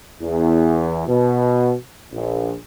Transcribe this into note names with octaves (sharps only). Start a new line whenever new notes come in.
E2
B2
A#1